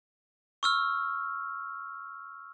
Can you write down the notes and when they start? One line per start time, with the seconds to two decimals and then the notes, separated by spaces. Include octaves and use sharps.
0.63 C#6 E6 F6